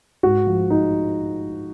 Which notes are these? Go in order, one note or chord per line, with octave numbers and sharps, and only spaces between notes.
G#2 F#4
F3
G#3 D#4